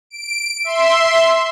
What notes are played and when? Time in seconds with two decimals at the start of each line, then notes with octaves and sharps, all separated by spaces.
0.10 D7
0.64 E5 C6